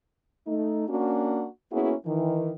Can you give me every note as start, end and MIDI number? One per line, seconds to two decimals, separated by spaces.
0.47 0.86 57
0.47 0.86 63
0.88 1.47 58
0.88 1.47 61
0.88 1.47 62
0.88 1.47 66
1.72 1.94 58
1.72 1.94 59
1.72 1.94 61
1.72 1.94 64
1.72 1.94 66
1.72 1.94 68
2.06 2.52 51
2.06 2.52 52